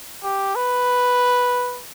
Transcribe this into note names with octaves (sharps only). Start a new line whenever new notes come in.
G4
B4